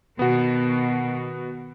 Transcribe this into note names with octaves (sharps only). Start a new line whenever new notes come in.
B2 D#3 B3 F#4